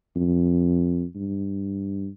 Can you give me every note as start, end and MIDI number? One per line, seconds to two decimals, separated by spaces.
0.16 1.04 41
1.15 2.09 43